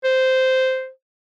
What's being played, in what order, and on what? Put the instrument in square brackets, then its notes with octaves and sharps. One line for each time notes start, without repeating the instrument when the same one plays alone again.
[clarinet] C5